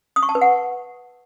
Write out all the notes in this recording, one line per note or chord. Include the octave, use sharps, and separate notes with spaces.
D#6
C#6
A5
B4
F#5